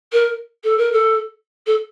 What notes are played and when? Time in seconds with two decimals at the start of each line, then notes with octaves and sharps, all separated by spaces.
0.12 A#4
0.64 A4
0.78 A#4
0.92 A4
1.66 A4